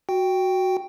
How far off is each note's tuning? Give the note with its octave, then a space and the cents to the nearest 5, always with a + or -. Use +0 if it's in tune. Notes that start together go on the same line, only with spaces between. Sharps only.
F#4 +0 G5 +0